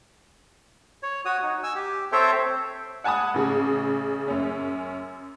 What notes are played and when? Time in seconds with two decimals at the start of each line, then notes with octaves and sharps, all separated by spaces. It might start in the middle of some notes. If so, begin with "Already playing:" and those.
1.03 C#5
1.25 F#4 C#5 D#6
1.43 D#4
1.63 G#5 E6
1.75 G4
2.12 C4 A4 C5 C#5 E5 G5
3.04 F#5 G#5 A5 B5 D#6
3.34 A1 C#3
4.28 F#2 C#4